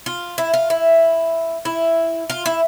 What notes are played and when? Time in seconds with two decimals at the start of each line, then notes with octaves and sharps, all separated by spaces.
0.06 F4
0.38 E4
0.54 F4
0.70 E4
1.65 E4
2.30 F4
2.46 E4